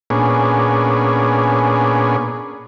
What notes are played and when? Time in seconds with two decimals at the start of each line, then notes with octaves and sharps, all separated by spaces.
0.10 A#2 B3 C#4 D4 G#4